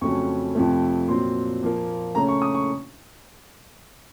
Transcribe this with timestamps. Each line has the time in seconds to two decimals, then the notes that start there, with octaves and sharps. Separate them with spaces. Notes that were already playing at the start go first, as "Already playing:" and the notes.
0.01 F2 C#3 F#3 A3 C#4 C#6
0.55 F2 C3 F3 A3
1.08 A#2 F#3 C4 C6
1.62 A#2 F3 A#3
2.15 C#3 A3 C#4 A#5
2.28 C#6
2.42 D#6
2.55 C#6